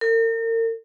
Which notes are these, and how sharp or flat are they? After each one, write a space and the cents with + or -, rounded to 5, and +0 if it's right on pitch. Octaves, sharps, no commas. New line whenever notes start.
A#4 -40